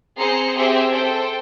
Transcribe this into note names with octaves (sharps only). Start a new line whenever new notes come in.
C4 G#4 C5 A#5 C7 C#7
C4 G4 G#4 C5 E5 G5
A4 C5 G5